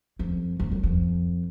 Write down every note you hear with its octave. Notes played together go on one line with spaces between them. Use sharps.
F2
F2
F#2
F2